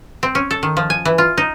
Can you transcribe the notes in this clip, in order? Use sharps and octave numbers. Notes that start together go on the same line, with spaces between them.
C4
C#4
A4
D#3
F3
G#5
E3
F4
D#4